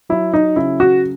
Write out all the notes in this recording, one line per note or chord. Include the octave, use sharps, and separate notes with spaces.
F#3 E4
D#4
C#3 E4
F#4